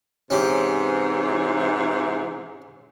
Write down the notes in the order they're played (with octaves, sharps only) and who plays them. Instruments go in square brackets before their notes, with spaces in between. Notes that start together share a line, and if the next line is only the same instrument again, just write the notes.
[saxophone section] G#2 C3 E3 [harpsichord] C#4 G4